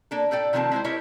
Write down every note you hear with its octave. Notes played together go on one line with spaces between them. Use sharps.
A#3 D4 A4
A2 A4 D5 G5
C3 D#3 F3 A#3 C4 A5
G#3 E4 G#4 C5
E4 G4 A#4 C#5 D#5 E5